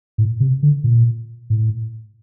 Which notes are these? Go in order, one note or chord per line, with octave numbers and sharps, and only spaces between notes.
A2
C3
D3
A#2
A2